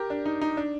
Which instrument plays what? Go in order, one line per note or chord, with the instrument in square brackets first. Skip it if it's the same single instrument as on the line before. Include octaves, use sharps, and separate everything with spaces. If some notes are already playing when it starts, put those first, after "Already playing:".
Already playing: [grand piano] G4 A#4
D4
D#4
D#4
D4